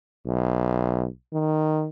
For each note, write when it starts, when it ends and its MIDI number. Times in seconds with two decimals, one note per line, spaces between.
0.26 1.06 35
1.33 1.89 51